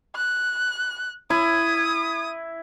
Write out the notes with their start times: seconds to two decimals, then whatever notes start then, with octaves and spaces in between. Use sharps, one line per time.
0.15 F#6
1.30 E4 D#6